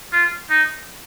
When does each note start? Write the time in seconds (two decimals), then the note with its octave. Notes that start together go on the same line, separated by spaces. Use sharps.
0.13 F4
0.50 D#4